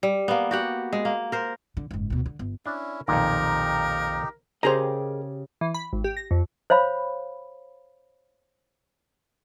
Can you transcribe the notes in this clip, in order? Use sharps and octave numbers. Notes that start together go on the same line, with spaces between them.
G3
A#3 B3
F#4 G4 F#5
G#3
A#3
A#4 C5
D3
F#1 G#2
D2 B2
D3
G1
C#4 D4 E4
B1 F2 A#2 D#3 D#4 G4 A#4
C#3 G4 G#4 A#4 C5 D#5 A#5
E3
B5
G#1
G4
A#6
F2
C5 C#5 F5 B5